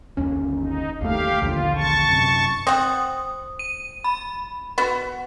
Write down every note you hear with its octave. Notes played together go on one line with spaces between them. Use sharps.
G1 D#2 C#4
D#4
G1 D#2 A3 G4 F5
A#1 D#2 D3 F4
A5 C#6
F#2 C3
C4 F#5 D#6
D#7
B5
B3 F#4